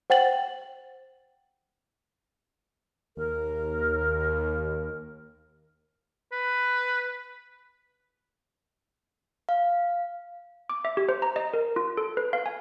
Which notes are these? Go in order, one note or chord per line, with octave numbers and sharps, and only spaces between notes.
C5 F#5 G5 A6 F#7
D#2 A#4
B4
F5
D6
E5
G4
C5
A#5
D#5
A#4
F4
A4
B4
F5
G#5